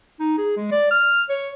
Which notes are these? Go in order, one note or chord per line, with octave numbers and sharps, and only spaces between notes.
D#4
G#4
G#3
D5
F6
C#5